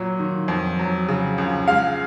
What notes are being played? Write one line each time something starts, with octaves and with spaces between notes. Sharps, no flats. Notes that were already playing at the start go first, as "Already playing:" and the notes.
Already playing: A#2 F#3
D#3
F2
F#3
C#3
C#2
G#3 F5